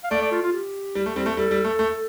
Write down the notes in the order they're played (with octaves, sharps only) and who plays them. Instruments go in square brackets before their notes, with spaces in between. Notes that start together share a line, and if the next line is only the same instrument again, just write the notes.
[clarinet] F5
[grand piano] A3 [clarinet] D5
[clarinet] D5
F4
F4
G4
[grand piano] G3
A3
G3 C4
A3
[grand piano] G3 [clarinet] A4
[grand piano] G3
A3
A3